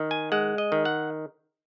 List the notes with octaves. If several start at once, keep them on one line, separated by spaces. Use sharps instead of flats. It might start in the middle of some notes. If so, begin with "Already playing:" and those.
Already playing: D#3
G#5
G#3 F#5
D#5
D#3
F#5